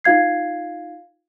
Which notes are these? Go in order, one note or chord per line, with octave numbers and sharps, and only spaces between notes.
D#4 F4 F5 G#6 C7